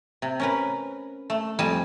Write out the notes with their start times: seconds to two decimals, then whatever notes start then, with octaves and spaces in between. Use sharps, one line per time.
0.22 C3
0.40 C#4 A#4 B4
1.30 A3
1.59 F2 G3 G#5 A5